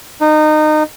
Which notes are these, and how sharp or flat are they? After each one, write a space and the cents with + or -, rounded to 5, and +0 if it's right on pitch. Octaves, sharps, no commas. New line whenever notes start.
D#4 -25